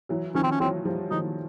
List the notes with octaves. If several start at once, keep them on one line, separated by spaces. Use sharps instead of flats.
E3 F#3
D#3 F3 C#4
C4
C#4
E3 F#3 C4
F3 G3
D#3 F3 D#4